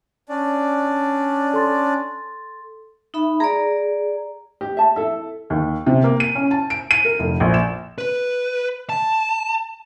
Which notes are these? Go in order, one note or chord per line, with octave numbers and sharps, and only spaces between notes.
C#4 D4 D5
A4 C6 A6
D#4 E5 B5
G#4 D5 A#5
G4 D#5
E5 A5
E4 A4 E5
D#2
C3
A#3
D#7
C#4
A5
D7
D#7
A#4
F1
A#1
E7
B4
A5